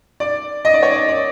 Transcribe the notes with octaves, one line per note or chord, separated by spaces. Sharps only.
D5
D#5
D5
C#5
D5
D5